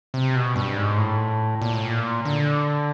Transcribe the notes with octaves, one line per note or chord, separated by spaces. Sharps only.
C3
B2
G2
G#2
A2
A#2
A2
A#2
D3